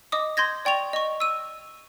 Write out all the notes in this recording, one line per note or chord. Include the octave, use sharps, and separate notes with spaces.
D#5 D6 D#6
C6 G6 G#6 A#6
D5 G5 C#6 F7
D#5 C#6
E6 D#7